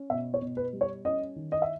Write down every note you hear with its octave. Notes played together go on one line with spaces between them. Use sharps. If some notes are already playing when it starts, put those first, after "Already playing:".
Already playing: C#4
B2 E5
C#5
B2
B4
G3
C#5
C#4 D#5
D#3
D#5
E5